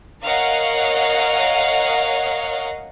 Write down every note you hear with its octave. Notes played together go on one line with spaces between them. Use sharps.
A#4 C#5 D#5 F5 F#5